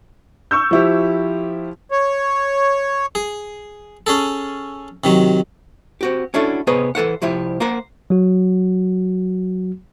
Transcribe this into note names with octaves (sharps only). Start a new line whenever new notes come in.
C#6 E6 G6
F3 E4 G4
C#5
G#4
C#4 G#4 A4
C3 D#3 F#3
C4 F#4 G4
C#4 D4 E4 F#4 A4
C3 B3 G#4 C#5 D#5
E3 A4 C5 F#5
C2 F3 E4 G4
A#3 A#4 C5 F#5
F#3 F#4